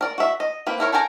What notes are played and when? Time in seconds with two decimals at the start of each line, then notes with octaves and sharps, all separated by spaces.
0.01 A#4 D5
0.18 F#4 E5
0.40 D#5
0.67 A#3 C4 B4
0.80 E4 A#4 C#5
0.92 A4 A#4 G5 G#5 A#5